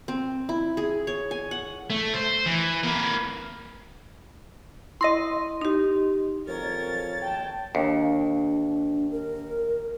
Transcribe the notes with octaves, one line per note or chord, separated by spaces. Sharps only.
C4
E4
G#4
C#5
G#5
F#5
A3
C5
E3
A#3 B4
E4 D#5 C6 A#6
D#4 G4
F2 A#4 C#5 A6
G5 A5
D#2 D4
A#4